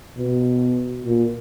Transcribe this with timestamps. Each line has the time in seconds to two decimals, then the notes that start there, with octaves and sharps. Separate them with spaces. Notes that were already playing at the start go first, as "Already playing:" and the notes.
0.18 B2
1.04 A#2